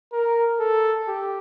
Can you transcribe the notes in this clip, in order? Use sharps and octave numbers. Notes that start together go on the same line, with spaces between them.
A#4
A4
G4